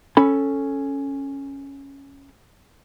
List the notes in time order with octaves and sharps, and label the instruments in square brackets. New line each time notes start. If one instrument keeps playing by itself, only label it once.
[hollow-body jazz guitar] C#4 A4 B5